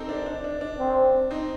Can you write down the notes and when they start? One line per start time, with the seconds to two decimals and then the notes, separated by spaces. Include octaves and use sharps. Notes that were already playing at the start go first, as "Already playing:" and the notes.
Already playing: C4 D#4 G4 A4 A#4 C5
0.09 D4
0.26 D4
0.44 D4
0.61 D4
0.79 C4
1.31 C4 D#4